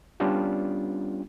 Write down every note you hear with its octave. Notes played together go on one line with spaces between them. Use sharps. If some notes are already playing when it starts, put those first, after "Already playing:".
G3 B3 C#4 D4 F4 G4